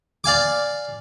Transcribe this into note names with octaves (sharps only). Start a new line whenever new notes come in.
D5 F5 G#5 D6